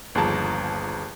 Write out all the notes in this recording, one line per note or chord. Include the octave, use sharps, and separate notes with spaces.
G1 D#2 F3 G#4 A5 A#5